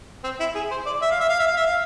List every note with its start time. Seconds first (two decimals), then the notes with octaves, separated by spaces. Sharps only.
0.24 C4
0.40 E4
0.55 G#4
0.71 C5
0.86 D5
1.02 E5
1.11 F5
1.20 E5
1.29 F5
1.39 E5
1.48 F5
1.57 E5
1.66 F5